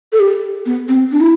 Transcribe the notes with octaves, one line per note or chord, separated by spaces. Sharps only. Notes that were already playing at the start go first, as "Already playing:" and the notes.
A4
G4
B3
C4
D4
E4